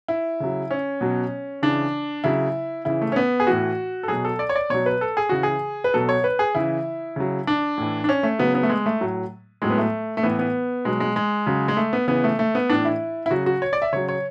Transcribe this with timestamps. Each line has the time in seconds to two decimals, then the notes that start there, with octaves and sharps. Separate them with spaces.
0.08 E4
0.40 C#3 F#3
0.71 C#4
1.01 B2 F#3
1.62 C#3 E3 D4
2.24 C#3 F#3 E4
2.85 C#3 E3 E4
3.02 A3
3.12 C#4
3.16 B3
3.40 G#4
3.47 A2 E3 F#4
4.03 A4
4.08 B2 F#3 G#4
4.25 A4
4.39 D5
4.49 C#5
4.55 D5
4.70 B2 F#3 C#5
4.86 B4
5.01 A4
5.17 G#4
5.29 C#3 E3 F#4
5.43 G#4
5.84 B4
5.94 B2 F#3 A4
6.09 C#5
6.24 B4
6.39 G#4
6.55 C#3 E3 E4
7.16 C#3 F#3
7.47 D4
7.78 A2 E3
8.04 D4
8.09 C#4
8.23 A3
8.39 C#3 F#3 B3
8.55 B3
8.63 A3
8.69 G#3
8.86 A3
9.00 A2 F#3
9.62 A2 F#3 G#3
9.70 B3
9.78 A3
10.17 A3
10.23 A2 E3 B3
10.39 B3
10.85 B2 F#3 G#3
11.00 G#3
11.16 G#3
11.47 C#3 F#3
11.68 G#3
11.77 A3
11.93 B3
12.08 C#3 E3 B3
12.24 A3
12.39 A3
12.55 B3
12.69 A2 E3 D4
12.85 E4
13.26 E4
13.31 C#3 F#3 F#4
13.46 F#4
13.62 C#5
13.73 D5
13.82 E5
13.93 C#3 F#3 C#5
14.09 C#5